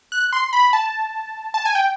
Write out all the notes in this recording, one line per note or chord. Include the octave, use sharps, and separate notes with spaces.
F#6
C6
B5
A5
A5
G#5
G5